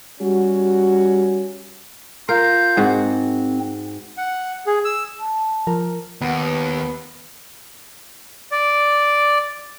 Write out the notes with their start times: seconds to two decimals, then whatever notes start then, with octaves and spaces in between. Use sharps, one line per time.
0.20 G3 C#4 F#4
2.29 F4 A#4 F5 G6
2.77 G#2 C4 F#4
4.17 F#5
4.67 G#4
4.85 E6
5.20 A5
5.67 F3 A#4
6.21 D#2 B3
8.52 D5